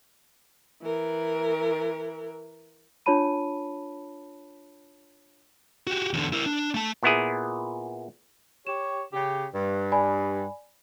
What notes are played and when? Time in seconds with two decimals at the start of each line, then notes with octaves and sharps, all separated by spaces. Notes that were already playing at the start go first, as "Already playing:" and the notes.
0.82 E3 A#4
3.06 D4 F4 C#5 A5 B5 D#7
5.87 F#4 G4
6.13 E2 D3
6.33 E4 A#4
6.46 D4
6.74 A3 A5
7.03 A#2 B3 E4 G#4
8.67 G4 C#5 E7
9.13 C#3 G4
9.54 G2
9.92 D5 G#5 B5